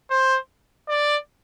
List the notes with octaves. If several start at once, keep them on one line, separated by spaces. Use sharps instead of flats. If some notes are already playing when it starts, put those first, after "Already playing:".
C5
D5